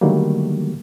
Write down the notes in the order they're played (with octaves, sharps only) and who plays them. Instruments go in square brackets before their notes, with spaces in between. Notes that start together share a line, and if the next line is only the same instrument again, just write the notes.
[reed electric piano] D3 D#3 F#3 G3 A3 A#3